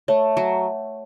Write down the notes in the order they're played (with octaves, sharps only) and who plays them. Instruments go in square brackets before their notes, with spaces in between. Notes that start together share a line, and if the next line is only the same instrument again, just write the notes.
[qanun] A3 [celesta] C#5
[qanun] F#3